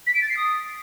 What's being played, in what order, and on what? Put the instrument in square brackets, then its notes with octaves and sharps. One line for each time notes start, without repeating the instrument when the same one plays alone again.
[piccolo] B6
D7
A6
C7
D#6